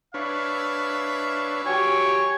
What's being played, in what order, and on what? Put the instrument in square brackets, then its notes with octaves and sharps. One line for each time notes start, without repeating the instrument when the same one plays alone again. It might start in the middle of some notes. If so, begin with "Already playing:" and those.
[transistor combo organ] D4 B4 C#5 [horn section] E5 F5
[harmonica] F#3 G4 G#5 [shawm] C#5